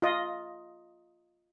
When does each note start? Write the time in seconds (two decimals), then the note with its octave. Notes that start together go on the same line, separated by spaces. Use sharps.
0.02 F4 D#5